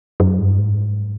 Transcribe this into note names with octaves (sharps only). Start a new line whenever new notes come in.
F#2
G2
G#2